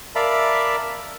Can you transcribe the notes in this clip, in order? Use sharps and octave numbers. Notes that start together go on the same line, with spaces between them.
A#4 D5 E5 F5 A5 B5